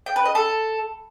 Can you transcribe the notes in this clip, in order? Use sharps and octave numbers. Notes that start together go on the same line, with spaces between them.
G5
B4
D#5
A4